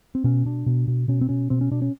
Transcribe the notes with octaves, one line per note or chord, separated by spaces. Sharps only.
C4
B2 C#4
B2 D4
B2
B2
B2 C#4
C4
B2 C#4
B2 C4
C#4
B2 D4
C#4